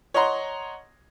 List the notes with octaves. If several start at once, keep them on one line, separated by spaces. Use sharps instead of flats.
C#5 D#5 F#5 A#5 C6